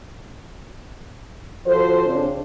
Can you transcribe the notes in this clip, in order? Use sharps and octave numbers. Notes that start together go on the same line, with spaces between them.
F3 F#4 A4 C5
C#3 C4 D4